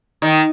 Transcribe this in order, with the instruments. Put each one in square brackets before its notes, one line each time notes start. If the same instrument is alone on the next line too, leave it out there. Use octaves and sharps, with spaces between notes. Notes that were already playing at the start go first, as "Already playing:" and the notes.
[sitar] D#3